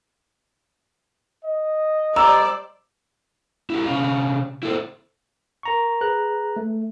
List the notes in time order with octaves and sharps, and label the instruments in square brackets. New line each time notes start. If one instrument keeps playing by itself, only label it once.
[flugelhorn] D#5
[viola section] G3 C5 D5 [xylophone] A#5 [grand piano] E6
[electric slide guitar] E4 G4
C3 C#4 F5
E4 A4 C5
[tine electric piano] A#4 A#5 C#6
G#4 B4 A#5 F#6
A3